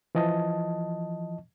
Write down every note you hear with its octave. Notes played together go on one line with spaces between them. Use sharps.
E3 F3 D#5 A5